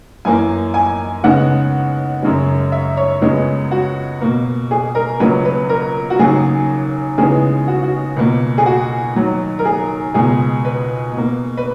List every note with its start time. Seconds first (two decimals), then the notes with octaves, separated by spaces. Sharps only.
0.25 F#2 E3 A#3 G#5
0.74 G#5
1.24 D#2 C#3 G#3 B3 F#5
2.23 F#2 C#3 G#3
2.72 E5
2.97 C#5
3.22 C#2 C#3 G#3 B3
3.71 F#4
4.21 B2 A#3
4.71 G#4
4.95 A#4
5.20 C#2 C#3 F#3 A#3 B4
5.45 B4
5.69 A#4
6.10 F#4
6.19 D#2 C#3 F#3 A#3 G#4
7.18 D#2 C#3 E3 G#3 B3 G#4
7.68 F#4
7.83 F#4
8.17 C#2 B2 A#3
8.58 G#4
8.66 F#4
9.15 D#2 D#3 F#3
9.59 A#4
9.65 G#4
10.14 C#2 B2 G#3 G#4
10.65 B4
11.13 B2 A#3
11.57 B4